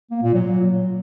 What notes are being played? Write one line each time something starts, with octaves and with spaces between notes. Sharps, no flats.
A#3
A#2
F#3